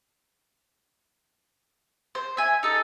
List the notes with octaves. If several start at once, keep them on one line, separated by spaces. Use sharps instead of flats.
C5
E5 G#5
D#4 A4